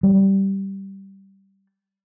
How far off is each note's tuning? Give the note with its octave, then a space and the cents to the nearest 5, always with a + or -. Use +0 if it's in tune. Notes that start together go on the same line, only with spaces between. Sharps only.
G3 -10